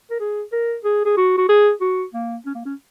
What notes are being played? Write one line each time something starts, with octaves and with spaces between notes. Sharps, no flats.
A#4
G#4
A#4
G#4
G#4
F#4
F#4
G#4
F#4
A#3
C#4
A#3
C#4